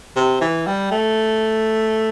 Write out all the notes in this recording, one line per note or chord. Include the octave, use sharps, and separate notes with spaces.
C3
E3
G3
A3